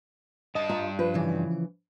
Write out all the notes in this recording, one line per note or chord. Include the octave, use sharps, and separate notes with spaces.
G2 D#5 A5
F4 E5 A#5
F3 B4
C#3 E3